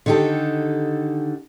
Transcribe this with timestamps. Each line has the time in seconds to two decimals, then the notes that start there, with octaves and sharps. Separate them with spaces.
0.06 D3 D#3 D#4 G4 A4